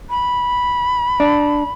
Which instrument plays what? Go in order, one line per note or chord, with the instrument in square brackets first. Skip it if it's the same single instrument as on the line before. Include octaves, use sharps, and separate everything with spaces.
[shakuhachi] B5
[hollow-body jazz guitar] D4